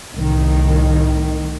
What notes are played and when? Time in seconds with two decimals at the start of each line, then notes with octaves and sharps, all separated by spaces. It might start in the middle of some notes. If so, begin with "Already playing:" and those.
0.15 C2 A2 D#3